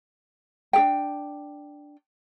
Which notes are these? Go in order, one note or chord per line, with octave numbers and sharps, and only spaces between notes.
D4 G#4 G5